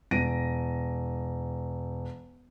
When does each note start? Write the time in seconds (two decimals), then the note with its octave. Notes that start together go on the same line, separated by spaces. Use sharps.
0.11 E1 A#6 D7 D#7